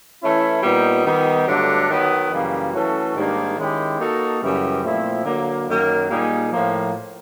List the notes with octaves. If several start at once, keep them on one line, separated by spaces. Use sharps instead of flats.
E3 A3 C#4 E4
A#2 G3 B3 D#4
D#3 G3 B3 D#4
G2 D3 F#3 A3 D4
D#3 F#3 B3
F#2 C#3 E3 G3 A#3
E3 A3 C#4 F#4 A4
G#2 D#3 G3 A#3 D4
D#3 G#3 C#4 E4 G4
A#3 D#4 F#4 A4
F#2 C#3 E3 G3
A#2 F3 A3 C4 E4
D3 F#3 A#3
F#2 D#3 F#3 A#3
A#2 G3 A#3 D#4 G#4
A2 F3 A#3